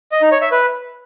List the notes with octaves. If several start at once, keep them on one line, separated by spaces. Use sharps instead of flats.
D#5
D#4
C#5
E5
B4